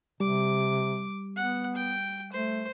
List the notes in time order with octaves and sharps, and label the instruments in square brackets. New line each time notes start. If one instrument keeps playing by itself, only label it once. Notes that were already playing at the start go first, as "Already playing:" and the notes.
[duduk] C3 [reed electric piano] G3 [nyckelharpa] D6
[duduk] B3 [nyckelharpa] F#5
[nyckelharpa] G5
[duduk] A3 [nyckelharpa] C5